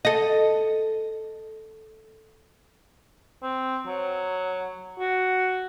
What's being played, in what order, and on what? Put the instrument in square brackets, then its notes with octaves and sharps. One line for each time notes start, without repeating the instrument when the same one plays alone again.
[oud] A4 D#5
[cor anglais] C4
F#3
F#4